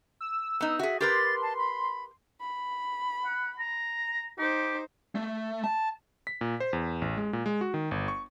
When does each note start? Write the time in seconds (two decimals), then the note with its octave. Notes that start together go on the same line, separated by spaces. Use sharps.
0.21 E6
0.61 B3 D#4
0.79 F#4 G#4 E5
1.01 G4 A#4 B4 C6 A6
1.42 A5
1.57 B5
2.41 B5
3.25 F#5
3.59 A#5
4.38 D#4 G4 C5
5.15 A3
5.64 A5
6.27 B6
6.41 A#2
6.60 C5
6.73 E2
7.02 A1
7.17 G#3
7.33 A#2
7.46 G#3
7.61 F#4
7.74 D#3
7.91 G1
8.08 C#6